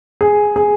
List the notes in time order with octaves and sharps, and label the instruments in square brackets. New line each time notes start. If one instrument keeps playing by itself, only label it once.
[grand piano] G#4
G#4